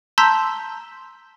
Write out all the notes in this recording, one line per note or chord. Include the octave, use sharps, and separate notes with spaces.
A5 A#5 C6 E6 G6 B6